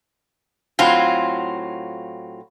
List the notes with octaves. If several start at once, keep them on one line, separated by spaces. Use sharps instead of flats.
A2 F#3 C4 F4